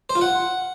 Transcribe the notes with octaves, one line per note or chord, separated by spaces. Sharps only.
C5
F4
F#5